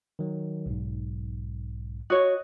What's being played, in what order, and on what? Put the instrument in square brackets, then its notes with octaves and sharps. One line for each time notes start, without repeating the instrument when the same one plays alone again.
[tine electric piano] D#3 F#3
B1 G#2
[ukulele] F#4 C#5 [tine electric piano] D#5 D#6 F#6